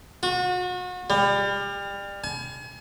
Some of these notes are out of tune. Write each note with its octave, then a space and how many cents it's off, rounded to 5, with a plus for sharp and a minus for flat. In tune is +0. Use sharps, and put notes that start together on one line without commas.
F#4 -35
G3 +30
G#5 +40